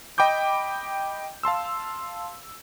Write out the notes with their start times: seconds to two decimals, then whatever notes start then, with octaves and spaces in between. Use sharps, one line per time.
0.18 D#5 G5 B5 D6 G6
1.43 F5 A5 C6 E6